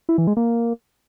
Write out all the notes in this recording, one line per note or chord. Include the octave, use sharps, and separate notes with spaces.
E4
E3
G#3
A#3